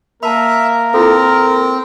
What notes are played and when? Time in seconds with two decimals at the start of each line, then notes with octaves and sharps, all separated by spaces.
0.23 A#3 A#4 E5 F#5 A5 B5
0.94 C4 E4 F4 A4